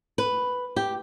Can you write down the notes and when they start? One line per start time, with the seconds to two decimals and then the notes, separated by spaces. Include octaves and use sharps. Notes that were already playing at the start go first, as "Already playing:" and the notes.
0.18 B4
0.76 G4